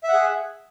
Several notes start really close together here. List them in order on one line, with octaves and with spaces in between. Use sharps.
E5 F#5 G#4